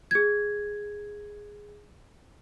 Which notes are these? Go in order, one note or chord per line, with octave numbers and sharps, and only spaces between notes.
G#4 G#6